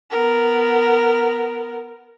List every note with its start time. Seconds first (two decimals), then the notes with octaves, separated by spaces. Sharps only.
0.11 B3 A#4